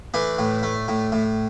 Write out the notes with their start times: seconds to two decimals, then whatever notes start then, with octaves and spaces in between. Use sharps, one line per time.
0.14 E3 A3 D4
0.39 A2
0.63 A3
0.88 A2
1.12 A2